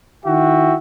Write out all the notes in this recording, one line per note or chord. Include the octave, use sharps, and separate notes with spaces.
D#3 E4 F#4 E5 G5